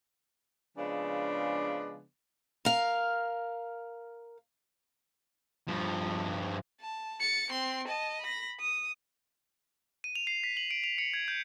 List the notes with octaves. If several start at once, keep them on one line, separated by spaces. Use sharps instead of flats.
C#3 F3 G#3 B3 D4
A#4 F5
G2 F3
A5
A6 C#7
C4 C6
D#5 A5
B5 A#6
D#6
D#7
F7
C7
B6
F#7
D7
F7
C#7
G#6
G6